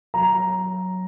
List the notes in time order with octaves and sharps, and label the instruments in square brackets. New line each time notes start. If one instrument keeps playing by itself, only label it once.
[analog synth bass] F#3 [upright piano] A#5